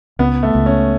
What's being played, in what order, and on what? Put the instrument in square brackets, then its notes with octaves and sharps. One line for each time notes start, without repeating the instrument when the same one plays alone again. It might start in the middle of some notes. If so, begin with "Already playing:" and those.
[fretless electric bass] C#2 [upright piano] B3
[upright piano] A3
[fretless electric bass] C#2
[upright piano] C#4